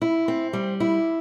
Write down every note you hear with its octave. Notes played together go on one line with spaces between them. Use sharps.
E4
C4
G3
E4